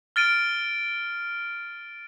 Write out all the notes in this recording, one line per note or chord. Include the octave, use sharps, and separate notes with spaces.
F6 A6 D7 D#7